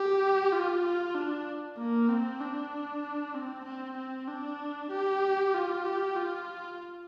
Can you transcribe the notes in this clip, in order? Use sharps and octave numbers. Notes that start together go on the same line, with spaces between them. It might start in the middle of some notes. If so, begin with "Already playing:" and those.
Already playing: G4
F4
F4
D4
A#3
C4
D4
C4
C4
C4
D4
G4
F4
G4
F4